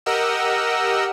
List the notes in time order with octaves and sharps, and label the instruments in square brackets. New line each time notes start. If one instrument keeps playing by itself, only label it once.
[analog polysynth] G4 A#4 D#5 F#5 E6